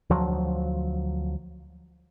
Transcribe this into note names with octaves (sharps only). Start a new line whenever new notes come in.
D2 F3 F#3